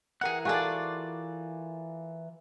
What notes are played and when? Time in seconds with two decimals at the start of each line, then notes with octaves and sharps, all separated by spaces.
0.21 E3 G#4 A#4 F#5 F#6
0.45 F4 F#4 G#4 A4 D5